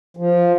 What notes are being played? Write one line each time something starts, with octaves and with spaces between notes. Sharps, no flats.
F3